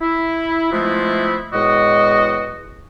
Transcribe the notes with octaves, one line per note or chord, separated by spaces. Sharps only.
E4
F3 G#3 A3 B3 C4 E4
E2 A2 G#3 F#4 D#5